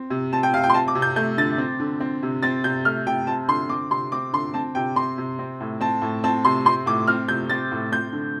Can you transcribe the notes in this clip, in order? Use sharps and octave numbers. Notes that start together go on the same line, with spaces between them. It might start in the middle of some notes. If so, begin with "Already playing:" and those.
Already playing: C4
C3
C4 A5
G5
C3 F5
G5
C6
C4 A5
D6
C3
G6
A3 G6
D3 A6
C4
D3
C4
C3
C4 A6
C3 G6
A3 F6
C3 G5
C4 A5
D3 C6
C4 D6
C3 C6
C4 D6
D3 C6
C4 A5
C3 G5
C4 C6
C3
C4
A2
C4 A5
A2
C4 A5
C3 C6
C4 C6
A2 D6
C4 F6
C3 G6
C4 A6
A2
C4 G6
D3